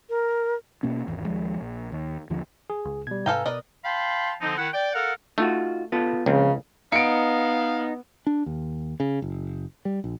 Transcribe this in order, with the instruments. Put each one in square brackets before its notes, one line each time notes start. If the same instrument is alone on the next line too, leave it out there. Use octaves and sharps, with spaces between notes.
[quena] A#4
[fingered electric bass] B2 A#3 C#4
G#1 E2
D#2 F3 G#3
A#1
D#2
D#2 D3 F3
[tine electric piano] G#4
[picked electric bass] C#2
[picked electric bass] B2 [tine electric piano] G3 G#6
[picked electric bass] G#2 C3 [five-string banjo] A4 F5 G5 [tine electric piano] B4 G#5 A#5
[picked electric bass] B2 [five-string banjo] A#4 B4 D#5 [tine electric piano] D5
[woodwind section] F5 G5 A5 B5 C6
D3 F3 C4 D#4
D#3 E4 F#5
D5 G5
A4 A#4 F5 F#5
[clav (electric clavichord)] A3 [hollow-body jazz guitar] D#4 F4 F#4
[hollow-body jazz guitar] B3 F4 A4
[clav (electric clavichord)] C#2 [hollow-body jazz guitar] A#2 F3 C4 [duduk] C#3
[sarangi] B3 [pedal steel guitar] D#4 [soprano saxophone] F5 [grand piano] C#7 D7
[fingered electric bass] D4
D#2
C#3
F#1
G3
A#1